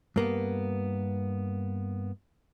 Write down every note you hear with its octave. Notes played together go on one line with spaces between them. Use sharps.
G2 A#3 B3